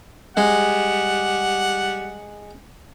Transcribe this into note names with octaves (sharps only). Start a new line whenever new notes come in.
G3 G#3 F#5